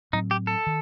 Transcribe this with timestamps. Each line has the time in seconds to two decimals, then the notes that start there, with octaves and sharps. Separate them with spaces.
0.13 A2 F#3 C4 D#4
0.31 G4
0.47 A4
0.67 D#3